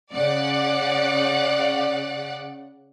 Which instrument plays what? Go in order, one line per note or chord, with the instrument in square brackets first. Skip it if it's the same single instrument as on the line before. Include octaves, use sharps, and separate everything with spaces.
[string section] C#3 D5 F#5